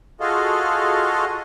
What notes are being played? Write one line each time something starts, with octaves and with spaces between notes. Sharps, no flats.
F4 F#4 G#4 A4 D#5 F5